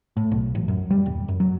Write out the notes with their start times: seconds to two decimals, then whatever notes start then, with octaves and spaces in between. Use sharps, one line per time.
0.17 A2
0.32 B1
0.55 A1
0.68 F#2
0.90 G3
1.06 D#1
1.28 F#2
1.40 F#3